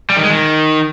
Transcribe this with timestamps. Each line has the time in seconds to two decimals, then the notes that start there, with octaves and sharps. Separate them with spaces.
0.10 G3
0.16 D#3
0.23 G#3
0.30 D#3